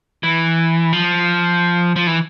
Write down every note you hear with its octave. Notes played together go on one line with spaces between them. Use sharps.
E3
F3
F3
E3